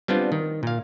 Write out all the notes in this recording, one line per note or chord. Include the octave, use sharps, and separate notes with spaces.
G3 B3 C4 D4 F4
D#3
A#2 F5